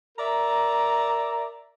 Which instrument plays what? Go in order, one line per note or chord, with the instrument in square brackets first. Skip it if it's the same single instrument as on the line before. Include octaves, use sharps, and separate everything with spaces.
[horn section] A#4 D5 E5 A#5